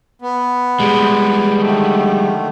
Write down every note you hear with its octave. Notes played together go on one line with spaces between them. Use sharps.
B3
G3 G#3
D3 D#3 A3